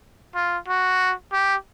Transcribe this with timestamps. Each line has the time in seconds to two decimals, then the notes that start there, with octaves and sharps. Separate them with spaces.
0.35 F4
0.68 F#4
1.33 G4